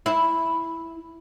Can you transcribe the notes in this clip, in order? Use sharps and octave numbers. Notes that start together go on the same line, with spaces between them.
E4